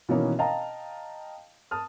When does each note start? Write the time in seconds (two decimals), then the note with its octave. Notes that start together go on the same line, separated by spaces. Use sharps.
0.09 B2 D#3 E3 A#3 C#4 D#4
0.39 D#5 F5 G5 A5 A#5
1.71 A5 D#6 F6